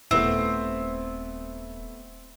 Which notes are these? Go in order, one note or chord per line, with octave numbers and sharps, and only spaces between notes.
D#1 A3 B3 C4 E4